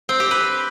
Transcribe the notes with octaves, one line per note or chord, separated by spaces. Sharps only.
C4
G4
B4